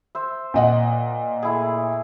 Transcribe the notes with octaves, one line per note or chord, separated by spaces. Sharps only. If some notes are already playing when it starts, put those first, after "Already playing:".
C5 E5
A#2 D#5 F#5
A3 E4 G#4